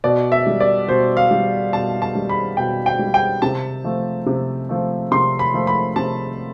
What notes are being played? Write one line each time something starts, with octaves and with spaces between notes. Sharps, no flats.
B2 D5
E5
G3
D5
B2 C5
F5
G3
B2 A5
A5
G3
B5
B2 G5
G5
G3
G5
C3 A5
F3 A3
C3
F3 A3
C3 C6
B5
F3 A3
B5
C3 A5